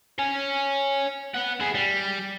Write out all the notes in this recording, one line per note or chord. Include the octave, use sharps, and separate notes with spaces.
C#5 G#5
B4 F#5
E4 G#4
G3